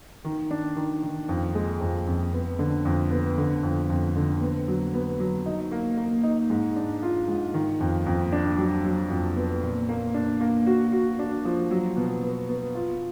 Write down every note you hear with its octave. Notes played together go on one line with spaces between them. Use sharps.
D#3
D4
D#3
D#3
F2
G#3
F2
F2
B3
D3
F2
B3
D3
F2
F2
D3
B3
F#3
B3
F#3
D#4
A#3
A#3
D#4
G#2
D4
F4
G#2
D#3
F2
F2
D4
F#3
F#3
F2
B3
A#2
A#3
D4
A#3
F#4
F#4
D4
F3
F#3
B2
B3
B3
F4